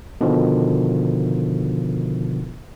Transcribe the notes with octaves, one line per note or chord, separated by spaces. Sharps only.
B2 D3 D#3 F3